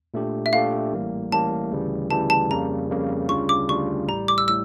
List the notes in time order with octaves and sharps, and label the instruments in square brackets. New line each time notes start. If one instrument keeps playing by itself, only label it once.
[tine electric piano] A#2 A3 D4 G4
[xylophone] E5
[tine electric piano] A#2 A3 D4 G4 [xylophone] F5
[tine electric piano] A1 A2 G3 A#3
[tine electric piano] A1 A2 G3 A#3 [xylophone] A5
[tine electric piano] D2 C#3 E3 G3
[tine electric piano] D2 C#3 E3 G3 [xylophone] A5
[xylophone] A5
[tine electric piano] F2 C#3 G3 A#3 [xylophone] A#5
[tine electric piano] F2 C#3 G3 A#3
[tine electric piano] D2 C#3 G3 D4 F4 [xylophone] C#6
[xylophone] D6
[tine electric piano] D2 C#3 G3 D4 F4 [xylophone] C#6
[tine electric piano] A1 A2 G3 [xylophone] A#5
[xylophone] D6
E6
[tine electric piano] A2 [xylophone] E6